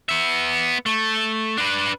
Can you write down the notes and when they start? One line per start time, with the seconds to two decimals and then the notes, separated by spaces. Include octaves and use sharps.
0.09 B3 E5
0.86 A3
1.57 D4 B4